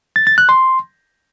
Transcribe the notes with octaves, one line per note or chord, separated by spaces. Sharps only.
A6
A6
F#6
C6